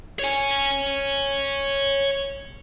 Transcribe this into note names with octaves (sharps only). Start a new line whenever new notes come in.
C#5 G#5